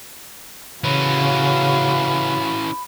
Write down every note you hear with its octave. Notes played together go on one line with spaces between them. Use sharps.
C#3 E3 C#4 F#4 F5 B5